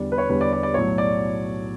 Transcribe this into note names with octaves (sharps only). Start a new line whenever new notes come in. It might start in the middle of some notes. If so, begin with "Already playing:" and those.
Already playing: E2 D3 G3 D5
B4
C#5
E2 D3 G3 B4
D5
D5
D5
B1 A2 F#3 C#5
D5